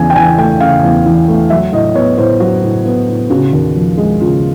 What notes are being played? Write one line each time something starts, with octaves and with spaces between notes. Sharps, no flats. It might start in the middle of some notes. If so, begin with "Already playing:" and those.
Already playing: E2 C#3 G#5
G5
E3 G#5
A3 G5
C#3 F5
E2
E3
A3
F#3 E5
A2 D#5
B3 C#5
A2 C5
F#3 F#4
A2
B3
A2
C#3 F#4
D#2
F3
G#3
C#3 F4